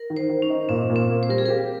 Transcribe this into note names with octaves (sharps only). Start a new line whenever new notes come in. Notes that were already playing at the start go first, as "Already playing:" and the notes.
Already playing: A#4
D#3
C5
D#3
C#4
D#4
A#2 C4
A#2
C4
A#3
C5
G3 A#4
G#4
G4 A#4